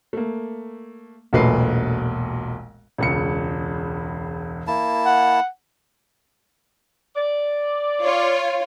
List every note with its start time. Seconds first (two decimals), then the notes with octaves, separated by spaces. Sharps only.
0.13 A3 A#3
1.33 E1 B1 A#2 A3 B4 C7
2.98 E1 C#2 C#7
4.67 A#3 E4 A5
5.06 F#5
7.15 D5
8.03 F4 C#5